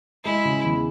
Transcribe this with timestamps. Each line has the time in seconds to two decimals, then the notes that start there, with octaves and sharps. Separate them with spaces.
0.25 G#3 E4
0.45 C#3
0.65 E2